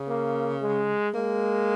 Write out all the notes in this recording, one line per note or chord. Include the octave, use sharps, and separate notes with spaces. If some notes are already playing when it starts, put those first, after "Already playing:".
Already playing: C#3
A#3
G#3
G#3 A#3